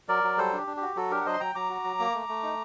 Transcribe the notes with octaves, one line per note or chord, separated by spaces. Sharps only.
F#3 A#4 D5
F#3
G3 A4 C5
D4 G4
D4
G4
F#4
F#3 F#4 A4
D4 G4 A#4
F#5
F#3 C5 D#5
C6
F#3 G5 A#5
F#3 A#5 D6
F#4
F#3
A#3
A3
A3
D#4